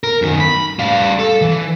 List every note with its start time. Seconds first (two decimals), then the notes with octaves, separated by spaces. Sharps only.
0.04 A#4
0.22 F#2 D#3
0.40 B5
0.79 G3 F5
1.19 A4
1.42 E3